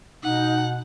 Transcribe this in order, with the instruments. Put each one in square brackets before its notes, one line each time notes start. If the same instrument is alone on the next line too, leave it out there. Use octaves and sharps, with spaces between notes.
[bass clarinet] B2 [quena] D#4 [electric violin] F#5